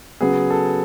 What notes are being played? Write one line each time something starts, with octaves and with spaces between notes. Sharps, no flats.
C#3 F#3 B3 G#4
A4